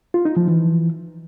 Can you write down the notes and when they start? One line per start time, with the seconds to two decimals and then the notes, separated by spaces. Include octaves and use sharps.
0.14 F4
0.25 D#4
0.37 F3
0.48 E3